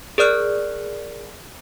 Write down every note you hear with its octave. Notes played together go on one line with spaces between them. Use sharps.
G#4 A#4 D5 F6 F#6